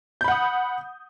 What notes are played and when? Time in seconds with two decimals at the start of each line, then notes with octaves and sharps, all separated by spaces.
0.21 G6
0.24 B5
0.28 F#5
0.31 D#6